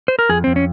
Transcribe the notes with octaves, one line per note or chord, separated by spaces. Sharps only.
C5
A#4
F2 G#4
F2 C4
C#4